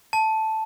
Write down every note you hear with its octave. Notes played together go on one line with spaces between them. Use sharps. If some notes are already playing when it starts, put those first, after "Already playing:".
A5